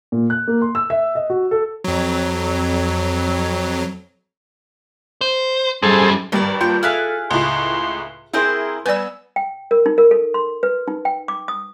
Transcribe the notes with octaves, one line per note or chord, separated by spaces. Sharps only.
A#2
F#6
A#3
C6
E6
E5
D#5
F#4
A4
F2 F#3
C5
F#2 G3 G#4 A4 C5
G#1 G2 G3 D5 D#5
A#3 D4 F4 G5
E4 G#4 A4 F5 F6 F#6 B6
C#2 A2 C6
C4 E4 G#4 A#4 C5 G#5 C6
G3 B3 B4 D5 G#5 E6
G5
A#4
D#4
A#4
A4
C6
B4
D#4
G5
D6
D#6